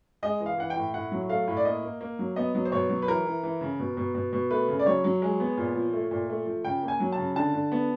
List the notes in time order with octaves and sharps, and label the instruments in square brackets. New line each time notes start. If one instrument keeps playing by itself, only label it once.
[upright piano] G#3 D#5
E3
F5
E3 F#5
G5
A2
A2 F#5
F#3
A3 F5
A2
D5
A#3 D#5
A#3
A#3
F#3
B3 D#5
F#3
C5
B2 C#5
F#3
B4
E3 A#4
E3
E3
C#3
B2
B2
B2
B2
A3 B4
C#3
D5
F#3 C#5
F#3
G#3
B3
A#2
F3
A3
A#2
A3
F3
C#3 G5
A#3
G#5
F#3
A5
C#3
D3 A5
D3
B3